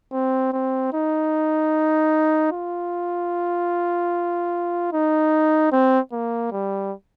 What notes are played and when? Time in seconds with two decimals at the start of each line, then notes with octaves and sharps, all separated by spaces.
0.13 C4
0.53 C4
0.93 D#4
2.52 F4
4.93 D#4
5.72 C4
6.12 A#3
6.52 G3